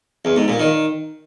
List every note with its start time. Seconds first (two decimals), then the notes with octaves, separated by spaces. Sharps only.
0.25 E2
0.36 G#2
0.48 A#2
0.60 D#3